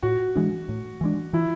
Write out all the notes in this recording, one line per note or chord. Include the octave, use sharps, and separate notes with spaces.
A2 F#4
E3 G#3 D4
A2
E3 G#3 D4
E3 E4